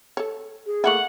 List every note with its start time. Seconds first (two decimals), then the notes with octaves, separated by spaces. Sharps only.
0.17 A4 C#5
0.66 G#4
0.84 A3 A#3 E4 F#5